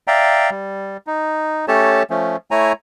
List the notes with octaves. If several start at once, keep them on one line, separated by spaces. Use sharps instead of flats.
D5 E5 F5 G5 A#5
G3
D#4
A3 C#4 G4 A4 C#5 A5
F3 A3 C#4
A3 E4 C#5 G#5 A#5